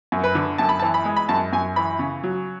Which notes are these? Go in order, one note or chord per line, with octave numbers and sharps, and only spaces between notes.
F#2
B4
D3
F#2 A5
B5
A5
E3
B5
G#3
B5
F#2 A5
F#2 G#5
E3 B5
C#3
F#3